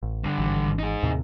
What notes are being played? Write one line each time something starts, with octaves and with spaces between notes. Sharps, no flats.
A1
G2 D3
G#1 E3
D#4 G#4
D#2 A2 C3